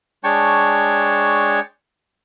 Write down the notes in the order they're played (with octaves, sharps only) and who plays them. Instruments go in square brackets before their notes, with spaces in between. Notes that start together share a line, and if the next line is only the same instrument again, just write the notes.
[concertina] G#3 D4 C#5 G5 A5 C#6